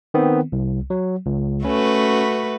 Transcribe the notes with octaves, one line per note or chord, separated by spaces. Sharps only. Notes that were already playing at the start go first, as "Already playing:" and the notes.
D#3 B3 C4
C2
F#3
C#2
A3 C#4 F#4 B4